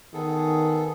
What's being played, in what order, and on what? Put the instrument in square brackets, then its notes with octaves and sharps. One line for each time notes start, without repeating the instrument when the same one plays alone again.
[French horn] D#3 [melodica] B3 G#4 A4